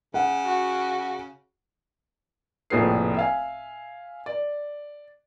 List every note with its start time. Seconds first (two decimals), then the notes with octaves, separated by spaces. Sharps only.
0.14 C#3 F#5
0.45 F#4
2.70 F1 A#1 A2 G#4 B4 C7
3.17 E5 F5 G#5
4.26 D5